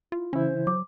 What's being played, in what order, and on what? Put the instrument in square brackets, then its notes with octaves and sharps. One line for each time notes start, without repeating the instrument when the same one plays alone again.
[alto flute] E4 [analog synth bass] F4
[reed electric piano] C#3 E3 E4 [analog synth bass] C#4 [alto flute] C5
[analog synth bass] F#3 [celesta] D6